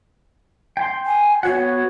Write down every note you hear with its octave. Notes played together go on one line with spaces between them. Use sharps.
G5 C6
G#5
B3 F#4 C#5 F#5